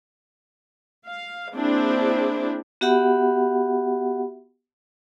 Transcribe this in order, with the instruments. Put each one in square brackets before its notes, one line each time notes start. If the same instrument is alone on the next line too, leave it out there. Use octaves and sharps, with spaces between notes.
[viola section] F5
A#3 C4 D4 E4 G#4 C5
[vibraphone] B3 F#4 G4 E5 F#5 B5